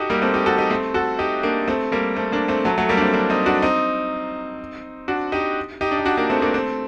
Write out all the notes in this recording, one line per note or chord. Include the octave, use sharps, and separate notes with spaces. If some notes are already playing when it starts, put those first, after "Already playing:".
Already playing: D#4 F#4 G4 A4
G3 A#3
A3 C4
D#4 G4
F#4 A4
D#4 G4
A3 C4
F#4 A4
D#4 G4
A#3 D4
A3 C4
G3 A#3
A3 C4
A#3 D4
A3 C4
F#3 A3
F#3 A3
G3 A#3
D4
A3 C4
A#3 D4
C4 D#4
D4 F#4
C4 D#4
D4 F#4
D#4 G4
D#4 G4
D4
D#4
D4 F#4
A#3 D4
A3 C4
A#3 D4
A3 C4